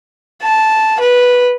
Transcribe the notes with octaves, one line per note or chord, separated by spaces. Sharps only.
A5
B4